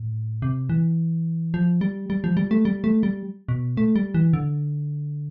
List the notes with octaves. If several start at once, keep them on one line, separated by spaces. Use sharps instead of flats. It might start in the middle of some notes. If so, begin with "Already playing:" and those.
Already playing: A2
C3
E3
F3
G3
G3
F3
G3
A3
G3
A3
G3
B2
A3
G3
E3
D3